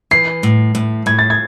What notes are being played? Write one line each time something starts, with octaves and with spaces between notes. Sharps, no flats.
E3 C7
A2
A2
A2 G#6
A6
G#6